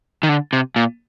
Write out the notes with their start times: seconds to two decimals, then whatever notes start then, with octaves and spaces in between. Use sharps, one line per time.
0.23 D#3
0.29 D3
0.53 C3
0.76 A#2